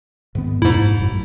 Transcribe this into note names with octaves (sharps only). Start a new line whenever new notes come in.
G#2 D#3 B3
F2 G#2 B2 A3 E4
G#1 F#2